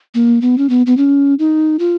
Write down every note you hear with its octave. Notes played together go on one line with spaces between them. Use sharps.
A#3
B3
C#4
B3
B3
C#4
D#4
F4